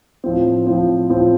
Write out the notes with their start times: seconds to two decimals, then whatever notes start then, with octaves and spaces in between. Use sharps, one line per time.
0.24 A2 F3 C4
0.67 A2 F3 C4
1.10 A2 F3 C4